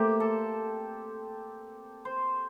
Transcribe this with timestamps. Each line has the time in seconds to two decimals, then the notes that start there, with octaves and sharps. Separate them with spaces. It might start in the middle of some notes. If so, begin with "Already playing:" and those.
Already playing: A3 A#3 C4 G4
0.20 A4
2.05 C5